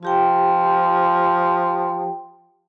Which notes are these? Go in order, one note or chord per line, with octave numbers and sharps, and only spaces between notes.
F3 F4 G4 G5